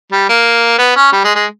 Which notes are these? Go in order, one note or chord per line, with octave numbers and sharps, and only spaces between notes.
G3
A#3
B3
C#4
G3
G#3
G#3